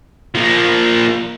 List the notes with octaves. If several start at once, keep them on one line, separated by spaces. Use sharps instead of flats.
F3 A#3